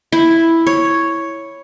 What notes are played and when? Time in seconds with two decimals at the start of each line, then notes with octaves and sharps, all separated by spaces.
0.12 E4
0.67 C#5